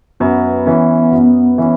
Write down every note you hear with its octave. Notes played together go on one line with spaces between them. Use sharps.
F#2 B3
E3 C#4
F#2
E3 C#4